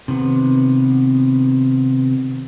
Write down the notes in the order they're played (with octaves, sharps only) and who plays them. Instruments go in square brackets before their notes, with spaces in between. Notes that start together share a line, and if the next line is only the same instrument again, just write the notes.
[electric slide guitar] C3 D#3 B3